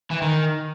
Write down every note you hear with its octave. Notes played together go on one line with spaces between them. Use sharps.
E3
D#3